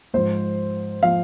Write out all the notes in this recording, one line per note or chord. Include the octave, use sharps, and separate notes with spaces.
G#2 F3 C5
F3 F5